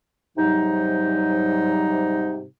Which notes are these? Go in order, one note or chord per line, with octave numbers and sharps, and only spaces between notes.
G#2 C3 F#3 G3 D#4